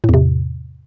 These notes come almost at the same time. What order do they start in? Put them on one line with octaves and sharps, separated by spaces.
A2 E2 C3